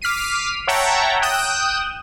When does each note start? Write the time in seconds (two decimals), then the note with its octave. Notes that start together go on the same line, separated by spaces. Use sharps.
0.02 D6 F6 B6 C7 D#7
0.67 C#5 E5 F#5 G5 A5 A#5
1.22 G5 D#6 F#6 G6 E7